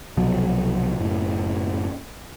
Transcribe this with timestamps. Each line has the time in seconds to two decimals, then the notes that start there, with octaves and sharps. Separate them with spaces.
0.17 C2 B2 F3 F#3
0.99 F#1 A2